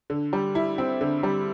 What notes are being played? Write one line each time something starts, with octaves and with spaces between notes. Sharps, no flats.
D3
G3
E4
C4
D3
G3